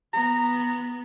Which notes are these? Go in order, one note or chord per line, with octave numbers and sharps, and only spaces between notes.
B3 A#5